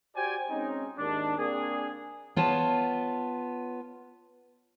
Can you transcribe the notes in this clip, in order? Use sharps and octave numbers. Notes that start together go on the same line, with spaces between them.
F#4 G4 C5 D5 G5 G#5
G#3 C4 C#4 D#4
D#2 G#2 D#3 D4
A#3 C4 D4 G#4
B3 F4 C#5 A5